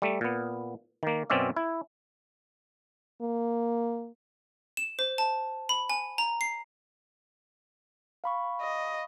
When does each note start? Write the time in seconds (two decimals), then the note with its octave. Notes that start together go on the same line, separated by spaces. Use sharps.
0.02 G3 A3
0.21 A#2 B3
1.03 D#3 A#3
1.30 F#2 B2 C4 C#4 D5 E5
1.57 E4
3.21 A#3
4.77 E7
4.99 C5
5.18 A5
5.69 B5
5.90 G#5
6.18 A#5
6.41 C7
8.24 F5 B5 C#6
8.61 D#5